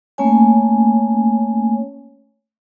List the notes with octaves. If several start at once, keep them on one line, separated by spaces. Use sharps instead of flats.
A3 A#3 C#4 C#5 G#5